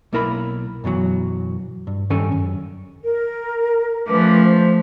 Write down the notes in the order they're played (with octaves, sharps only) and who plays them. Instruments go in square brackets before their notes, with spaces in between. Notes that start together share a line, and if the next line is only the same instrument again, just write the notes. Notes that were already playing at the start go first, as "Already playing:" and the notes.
[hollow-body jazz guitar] B1 A#3 E4 A#4 A5 B5
F#2 B2 E3 F#3
G2
G2 D#3 C#4 A4 G5 G#5
F#2
[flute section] A#4
[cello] F3 A3 [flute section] C#4 B4 D6
[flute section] C5